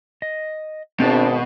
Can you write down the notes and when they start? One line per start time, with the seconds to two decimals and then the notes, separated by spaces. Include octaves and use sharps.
0.22 D#5
1.00 G#1 B2 C4 D4 A5